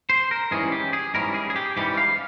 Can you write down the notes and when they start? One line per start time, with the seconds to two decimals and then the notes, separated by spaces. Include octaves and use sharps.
0.10 C5
0.31 A#4
0.51 G#2 E3 G3 C#4 G#4
0.72 G4
0.93 G#4
1.14 G#2 E3 G3 C#4 A#4
1.34 G#4
1.50 G#4
1.56 G4
1.77 G#2 E3 G3 C#4 G4
1.97 F5